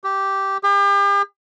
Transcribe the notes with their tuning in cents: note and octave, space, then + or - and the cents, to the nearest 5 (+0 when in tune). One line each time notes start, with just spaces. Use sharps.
G4 -10
G4 +40